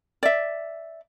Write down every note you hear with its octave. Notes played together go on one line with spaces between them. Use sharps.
D5 E5